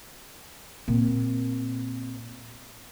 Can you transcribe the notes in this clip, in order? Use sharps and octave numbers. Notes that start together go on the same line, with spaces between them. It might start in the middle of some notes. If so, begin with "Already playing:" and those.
A#2 C4